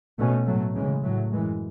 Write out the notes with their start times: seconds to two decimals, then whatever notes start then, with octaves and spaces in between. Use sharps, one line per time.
0.18 B2 A3 C#4
0.46 A2 F#3 A3
0.75 C#3 E3 G#3
1.04 A2 F#3 A3
1.32 F#2 E3 G#3